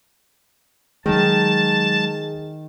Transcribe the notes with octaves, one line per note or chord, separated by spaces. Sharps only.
D#3 F#3 G#3 G#4 A5